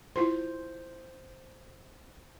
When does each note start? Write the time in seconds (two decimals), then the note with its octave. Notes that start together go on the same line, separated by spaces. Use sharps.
0.16 E4 F4 C5 C6